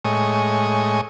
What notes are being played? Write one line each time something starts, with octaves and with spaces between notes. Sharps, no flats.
A2 G#3 C#5 D#5